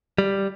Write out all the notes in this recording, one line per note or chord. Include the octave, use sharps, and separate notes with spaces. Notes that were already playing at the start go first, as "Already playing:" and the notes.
G3